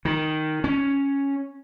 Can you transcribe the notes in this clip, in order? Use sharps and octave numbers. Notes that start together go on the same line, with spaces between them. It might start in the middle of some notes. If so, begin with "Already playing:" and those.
D#3
C#4